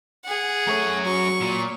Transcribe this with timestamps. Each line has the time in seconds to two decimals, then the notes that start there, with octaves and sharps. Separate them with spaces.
0.25 G#4 F#5
0.68 F#2 A3 C#5
1.05 F#3 C#6
1.42 A#2